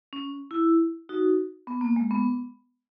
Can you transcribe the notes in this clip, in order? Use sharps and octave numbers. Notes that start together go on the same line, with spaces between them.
C#4
E4
D#4 F#4
B3
A#3
G#3
B3